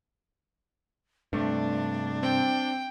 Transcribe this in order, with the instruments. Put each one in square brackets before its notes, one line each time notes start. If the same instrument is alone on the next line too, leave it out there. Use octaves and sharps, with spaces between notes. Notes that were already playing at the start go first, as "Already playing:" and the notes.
[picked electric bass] G2 C3 [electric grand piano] A3 [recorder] D4
[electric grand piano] C4 [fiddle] G5